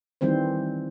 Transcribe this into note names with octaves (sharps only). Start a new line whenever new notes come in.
D#3 E3 G3 C4 C5